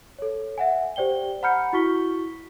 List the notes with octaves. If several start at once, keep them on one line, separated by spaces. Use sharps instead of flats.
A4 C#5
E5 F#5 G#5
G4 C5 D5 G5 G7
F#5 A#5 B5 F6 G6 C#7
E4 F#4 C#6 B6 G7